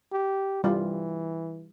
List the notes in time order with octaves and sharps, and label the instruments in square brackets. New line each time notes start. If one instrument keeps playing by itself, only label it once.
[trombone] G4
[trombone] E3 [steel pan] G3 F4